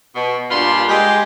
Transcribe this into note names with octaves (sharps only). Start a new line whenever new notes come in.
B2
G2 A#2 D4 F4 B5 C6
G#3 G4